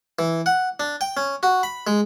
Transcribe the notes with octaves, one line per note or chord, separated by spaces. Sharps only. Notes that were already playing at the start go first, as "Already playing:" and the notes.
E3
F#5
D4
G5
C#4
F#4
B5
G#3